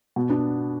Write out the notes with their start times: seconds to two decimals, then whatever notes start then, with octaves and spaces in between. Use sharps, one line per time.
0.16 B2
0.29 B3 D4